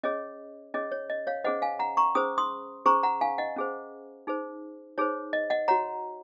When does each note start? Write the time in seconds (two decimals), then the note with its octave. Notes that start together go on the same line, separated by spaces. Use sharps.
0.03 C#4 G#4 C#5 D#5
0.74 C#4 G#4 C#5 D#5
0.92 C#5
1.10 D#5
1.27 C#5 F5
1.44 C#4 G#4 C5 D#5 F#5
1.62 F5 G#5
1.79 F#5 A#5
1.97 A#5 C#6
2.15 C#4 G#4 C5 D#6
2.38 C6 D#6
2.86 C#4 G#4 C5 A#5 C#6
3.03 F#5 A#5
3.21 F5 G#5
3.38 D#5 F#5
3.56 C#4 G#4 C5
4.27 D#4 G#4 C5
4.98 D#4 G#4 C5 C#5
5.33 D#5
5.50 D#5 F#5
5.68 F#4 C#5 F#5 A#5